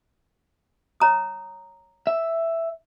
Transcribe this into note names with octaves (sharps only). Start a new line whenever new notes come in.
C#5 A#5 D#6
E5